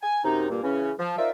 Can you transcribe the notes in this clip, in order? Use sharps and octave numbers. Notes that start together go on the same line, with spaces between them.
G#5
F#2 C3 D#4
G2 A#2 A#3
C#3 E3 C#4
F3
D#4 F4 A#4 C5 D5 E5